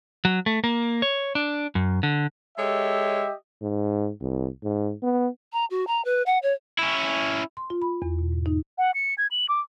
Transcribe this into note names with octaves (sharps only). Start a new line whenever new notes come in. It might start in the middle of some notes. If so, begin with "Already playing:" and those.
F#3
A3
A#3
C#5
D4
F#2
D3
G#3 G4 A4 C#5 D#5 E5
G#2
C2
G#2
B3
A#5
F#4
A#5
B4
F#5
C#5
C#4 E4
C6
F4
B5
E2
B2
G#2
D#4
F#5
C#7
G#6
F#7
D6